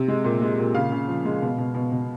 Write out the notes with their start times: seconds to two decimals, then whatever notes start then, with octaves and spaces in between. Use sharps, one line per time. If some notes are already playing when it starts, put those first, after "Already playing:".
Already playing: C3
0.08 G#3
0.24 A#2
0.42 G#3
0.59 A#2
0.75 C#3 F5
0.92 C#3
1.08 F3
1.25 G#3
1.42 B2
1.58 B2
1.74 B2
1.92 B2